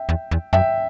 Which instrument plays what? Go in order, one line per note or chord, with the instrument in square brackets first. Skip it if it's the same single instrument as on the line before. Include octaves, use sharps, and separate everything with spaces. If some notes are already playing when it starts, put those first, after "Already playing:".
Already playing: [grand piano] E5 G5
[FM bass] E2
E2
[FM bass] F#2 [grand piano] E5 G5